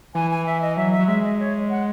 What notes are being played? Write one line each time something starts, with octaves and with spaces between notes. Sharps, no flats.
E3 G#5
G#5
E5
D#5
F#3 E5
E5
F#3
G#3 E5
D#5
C#5
F#5